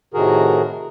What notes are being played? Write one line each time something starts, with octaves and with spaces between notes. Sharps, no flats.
A2 C3 D#3 F#4 G#4 A#4